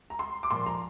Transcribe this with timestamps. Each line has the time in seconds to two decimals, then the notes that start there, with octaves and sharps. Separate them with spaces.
0.10 A#5
0.19 C6
0.43 D6
0.51 A#2 F3 C6
0.66 A#5